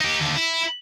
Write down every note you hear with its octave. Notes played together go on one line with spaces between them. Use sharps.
D#4 G4
D#2 D3
E4